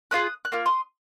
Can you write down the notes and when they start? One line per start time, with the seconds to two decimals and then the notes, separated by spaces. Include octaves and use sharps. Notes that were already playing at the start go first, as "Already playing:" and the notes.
0.11 C#4 F4 G#4 D#6 F#6
0.45 F#6
0.52 A#3 F4 F6
0.66 C6 D#6